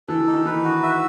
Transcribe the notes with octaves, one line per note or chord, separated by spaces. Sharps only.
E3 A4
E3
D#4
D#3
E3 B4
F#4
E5